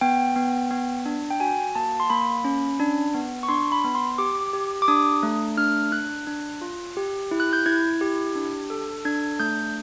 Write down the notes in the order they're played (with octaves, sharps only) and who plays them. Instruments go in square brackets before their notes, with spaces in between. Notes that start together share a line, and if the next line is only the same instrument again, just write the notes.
[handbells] B3 G5
B3
B3
D4
G5
F#4 G#5
A#3 A5
C6
A#3 B5
C#4
D4
B3
C#6
D4 C6
B5
B3
C6
G4 D6
G4
D6
D4 D#6
A3
D4 F6
D4 F#6
D4
F4
G4
E4
F#6
G6
E4 G#6
G4
D4
A4
D4 G#6
A3 G6